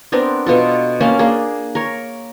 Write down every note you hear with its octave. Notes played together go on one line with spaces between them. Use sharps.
B3 C4 D4 A#4
B2 B3 F4 A4
A#3 C#4 F5 A5
A#3 D4 G#4
A#4 C#5